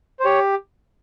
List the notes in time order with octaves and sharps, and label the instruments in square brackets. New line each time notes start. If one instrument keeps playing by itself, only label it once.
[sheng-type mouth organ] C5
G4 C#5